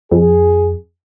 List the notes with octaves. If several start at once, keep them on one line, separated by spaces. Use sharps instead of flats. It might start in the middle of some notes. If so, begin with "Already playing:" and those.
F2 G#4